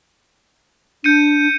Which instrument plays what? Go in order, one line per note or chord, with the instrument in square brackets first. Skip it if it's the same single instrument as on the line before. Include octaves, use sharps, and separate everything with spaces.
[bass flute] D4 [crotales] G6 C#7 D#7